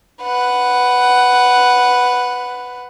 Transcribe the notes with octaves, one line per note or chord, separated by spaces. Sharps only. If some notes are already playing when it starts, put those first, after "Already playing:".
B4 F#5